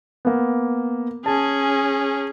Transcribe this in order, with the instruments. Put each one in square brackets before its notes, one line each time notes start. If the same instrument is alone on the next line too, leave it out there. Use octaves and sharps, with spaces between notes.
[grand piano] A#3 B3
[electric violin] C#4 G#4 [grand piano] A5